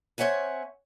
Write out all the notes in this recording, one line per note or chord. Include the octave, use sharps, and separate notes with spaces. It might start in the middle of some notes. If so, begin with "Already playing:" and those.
C4 C#5 E5 F#5 G#5